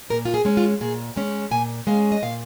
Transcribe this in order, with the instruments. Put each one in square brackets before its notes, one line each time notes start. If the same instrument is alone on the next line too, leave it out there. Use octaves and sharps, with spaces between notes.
[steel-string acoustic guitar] A#2 A#4
F4
G#4
G#3 C#4
F4
A#2 G#4
G#3 C#4
A#2 G#5
G#3 C#4 F5
D#5
A#2 F5